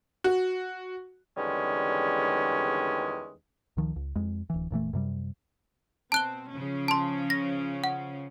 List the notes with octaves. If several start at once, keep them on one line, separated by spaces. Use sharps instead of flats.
F#4
E2 D3 D#3 G3 G#3 C#4
C#2 D#3 F3
C#2
F2 G#3
D1 E3
F1 A#2 E3 A3
F#2 C3 G3
B2 C4 A5 F#6 G7
C#3 F3 C#4
A5 C6
A#6
F#5